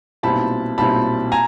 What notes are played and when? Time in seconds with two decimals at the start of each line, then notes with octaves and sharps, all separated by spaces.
0.23 B1 A#2 G3 C4 E4 A5 B5
0.78 B1 A#2 G3 C4 E4 A5 B5
1.32 G#5 A#5